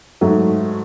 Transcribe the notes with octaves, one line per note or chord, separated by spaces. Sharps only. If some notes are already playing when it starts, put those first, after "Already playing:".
G#2 F#3 A3